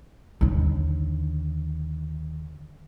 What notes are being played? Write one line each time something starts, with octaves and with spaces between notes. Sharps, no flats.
D#2 D3